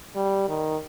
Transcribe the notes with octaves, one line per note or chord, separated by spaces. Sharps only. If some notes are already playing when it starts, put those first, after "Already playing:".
G3
D#3